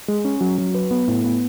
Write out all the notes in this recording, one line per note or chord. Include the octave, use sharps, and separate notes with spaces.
G#3
C#4
F#3
F#3
B4
B3
A2
B3